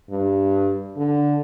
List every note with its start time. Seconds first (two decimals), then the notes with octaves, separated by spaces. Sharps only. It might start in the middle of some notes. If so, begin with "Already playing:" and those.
0.10 G2
0.97 D3